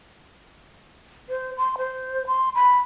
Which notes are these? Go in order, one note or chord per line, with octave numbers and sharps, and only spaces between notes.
C5
C6
C5
C6
B5